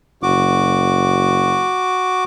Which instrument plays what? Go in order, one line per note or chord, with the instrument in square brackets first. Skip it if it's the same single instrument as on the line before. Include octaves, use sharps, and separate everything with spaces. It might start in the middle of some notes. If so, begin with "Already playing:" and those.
[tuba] F#1 [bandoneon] F#4 D6